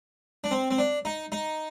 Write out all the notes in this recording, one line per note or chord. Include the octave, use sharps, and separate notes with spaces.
D4
C4
C4
D4
D#4
D#4